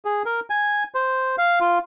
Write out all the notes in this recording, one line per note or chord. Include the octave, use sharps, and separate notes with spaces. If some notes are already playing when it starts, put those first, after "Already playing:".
G#4
A#4
G#5
C5
F5
F4